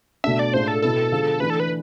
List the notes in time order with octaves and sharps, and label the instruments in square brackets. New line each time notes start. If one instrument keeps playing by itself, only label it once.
[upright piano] B2 A3 D4 [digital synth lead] E5
[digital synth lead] D5
[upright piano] A2 G#3 D4 F4 [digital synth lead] C5
[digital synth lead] A4
[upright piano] B2 B3 E4 [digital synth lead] A4
[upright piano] D3 F3 G#3
[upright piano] E3 A3 D4 [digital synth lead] B4
[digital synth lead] A4
B4